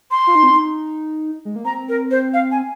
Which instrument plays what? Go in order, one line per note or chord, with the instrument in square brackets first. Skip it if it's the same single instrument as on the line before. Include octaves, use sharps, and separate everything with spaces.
[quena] C6
[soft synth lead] F4
D#4
C4
D#4
G#3
A#3
[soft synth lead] C4 [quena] A#5
[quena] A#4
C5
F5
G#5